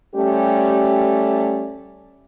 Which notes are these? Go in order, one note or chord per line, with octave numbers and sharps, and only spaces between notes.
G3 A3 C#4 G4